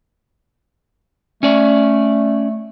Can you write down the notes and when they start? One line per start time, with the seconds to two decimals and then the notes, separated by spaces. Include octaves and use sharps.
1.43 A3 C#4 D5